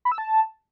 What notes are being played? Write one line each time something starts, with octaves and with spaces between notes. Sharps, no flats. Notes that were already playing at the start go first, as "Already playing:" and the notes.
B5
E6
A5